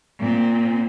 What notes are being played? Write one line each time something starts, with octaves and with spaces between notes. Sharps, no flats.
A#2 C4